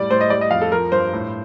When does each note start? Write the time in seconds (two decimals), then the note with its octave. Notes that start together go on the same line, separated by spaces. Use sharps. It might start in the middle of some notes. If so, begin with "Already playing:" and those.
Already playing: A2 G3 D5
0.10 A2 C5
0.21 D#5
0.30 G3 D5
0.41 D#5
0.51 F2 F5
0.61 A4
0.72 F3 A#4
0.92 G2 C5
1.13 A2